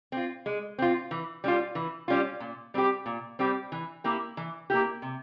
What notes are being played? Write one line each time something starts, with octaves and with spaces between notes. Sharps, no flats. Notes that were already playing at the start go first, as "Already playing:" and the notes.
C4 F4
G#3
C4 F4
E3
G3 C#4 F4
E3
G3 C#4 F4
A#2
G3 C4 G4
A#2
G3 C4 G4
E3
A#3 E4 G4
E3
A#3 E4 G4
C3